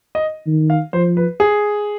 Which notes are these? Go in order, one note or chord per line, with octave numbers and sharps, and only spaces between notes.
D#5
D#3
F5
F3 C5
B4
G#4